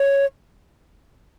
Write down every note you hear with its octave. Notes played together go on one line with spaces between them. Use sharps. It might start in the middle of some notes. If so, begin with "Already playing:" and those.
Already playing: C#5